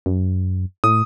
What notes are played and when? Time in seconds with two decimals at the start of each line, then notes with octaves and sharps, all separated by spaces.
0.06 F#2
0.84 A2 D#6